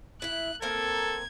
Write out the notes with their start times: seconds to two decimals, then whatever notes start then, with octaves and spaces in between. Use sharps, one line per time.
0.22 E4 E5 F#6
0.62 A#3 C4 A4 A#4 G#6